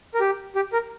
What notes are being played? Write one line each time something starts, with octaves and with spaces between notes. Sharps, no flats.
A#4
G4
G4
A#4